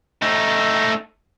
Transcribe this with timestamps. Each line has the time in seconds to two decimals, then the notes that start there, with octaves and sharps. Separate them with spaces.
0.22 A3 D#4